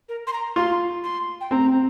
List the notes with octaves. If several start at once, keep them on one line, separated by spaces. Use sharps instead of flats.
A#4
C6
A#5
F4 C6
C6
G5
C4 A#5